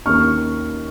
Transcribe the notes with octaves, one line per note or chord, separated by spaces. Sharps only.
D#2 D#3 A#3 C#4 C#6 F6